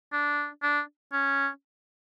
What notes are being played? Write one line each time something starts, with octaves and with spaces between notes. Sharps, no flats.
D4
D4
C#4